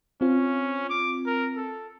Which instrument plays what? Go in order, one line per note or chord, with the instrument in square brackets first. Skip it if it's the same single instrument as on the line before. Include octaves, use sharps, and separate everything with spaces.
[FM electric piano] C4 F4 [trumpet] C#4
[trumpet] D6
A#4
A4